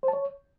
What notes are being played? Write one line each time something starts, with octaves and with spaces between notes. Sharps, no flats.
C5
A5
C#5